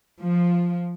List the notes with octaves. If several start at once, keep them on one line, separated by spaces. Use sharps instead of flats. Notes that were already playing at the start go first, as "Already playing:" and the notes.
F3